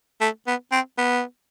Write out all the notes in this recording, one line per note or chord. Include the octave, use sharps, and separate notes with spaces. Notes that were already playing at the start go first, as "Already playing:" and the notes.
A3
B3
C4
B3